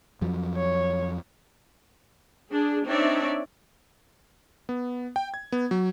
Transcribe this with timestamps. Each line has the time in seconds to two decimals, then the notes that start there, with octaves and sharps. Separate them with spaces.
0.21 F2 F3 F#3
0.57 C#5
2.51 D4 G#4
2.85 C4 D4 D#4 C#5 D5 E5
4.69 B3
5.16 G5
5.34 G#6
5.52 B3
5.71 F#3